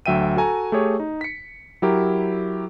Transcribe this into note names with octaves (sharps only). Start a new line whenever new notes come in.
D2 F#3 E5 G5 D#7
F#4 A4 G#5 A#5
A3 G4 G#4 C#5
D#4
B6 C#7
F#3 E4 G4 A#4